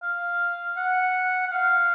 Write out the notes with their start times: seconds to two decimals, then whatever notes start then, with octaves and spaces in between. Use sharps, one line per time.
0.03 F5
0.77 F#5
1.46 F#5
1.52 F5